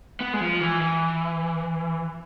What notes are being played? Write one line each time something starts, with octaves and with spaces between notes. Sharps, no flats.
B3
G#3
F3
E3
E3